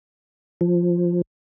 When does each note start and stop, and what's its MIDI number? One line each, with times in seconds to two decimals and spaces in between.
0.61 1.22 53